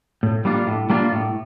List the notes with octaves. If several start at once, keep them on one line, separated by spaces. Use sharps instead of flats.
A2
G3 A#3 D4 F4
A2
G3 A#3 D4 F4
A2